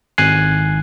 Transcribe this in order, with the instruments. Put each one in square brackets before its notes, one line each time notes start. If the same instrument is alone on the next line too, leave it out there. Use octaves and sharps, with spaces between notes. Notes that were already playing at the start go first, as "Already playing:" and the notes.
[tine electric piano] G#1 G#5 F#6 C7